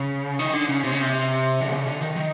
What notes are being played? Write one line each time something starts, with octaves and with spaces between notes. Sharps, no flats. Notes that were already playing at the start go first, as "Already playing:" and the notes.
Already playing: C#3
D#3
D3
C#3
C3
C#3
C3
D3
C#3
D3
D#3
D#3